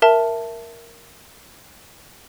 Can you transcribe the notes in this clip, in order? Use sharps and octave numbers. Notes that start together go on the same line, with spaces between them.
A#4 E5 A5